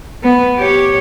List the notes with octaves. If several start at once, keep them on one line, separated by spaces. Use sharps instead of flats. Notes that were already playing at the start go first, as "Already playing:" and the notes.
B3
G4 C#5